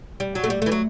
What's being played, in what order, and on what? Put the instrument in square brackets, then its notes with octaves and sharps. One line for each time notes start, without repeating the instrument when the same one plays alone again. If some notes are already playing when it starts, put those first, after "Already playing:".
[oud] G3
F#3
A3
G3
A3
E3
F#3